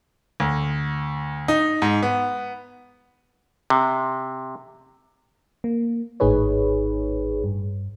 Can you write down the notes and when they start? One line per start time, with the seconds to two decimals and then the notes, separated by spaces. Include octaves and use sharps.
0.40 D2
1.48 D#4
1.82 G#2
2.03 B3
3.70 C3
5.64 A#3
6.20 G#1 A2 D#4 G#4 B4 C#5
7.44 G2